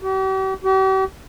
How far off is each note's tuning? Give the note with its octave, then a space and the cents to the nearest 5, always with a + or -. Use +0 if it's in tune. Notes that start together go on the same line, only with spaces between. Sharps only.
G4 -45
G4 -45